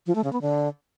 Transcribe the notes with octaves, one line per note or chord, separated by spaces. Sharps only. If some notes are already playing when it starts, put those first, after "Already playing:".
F3
A3
C#3
B3
D3